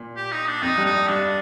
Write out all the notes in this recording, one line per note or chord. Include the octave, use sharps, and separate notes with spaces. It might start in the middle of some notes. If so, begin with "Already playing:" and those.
Already playing: A#2
G4
D#4
D4
F2 D#4
G2
D#4
G2 D4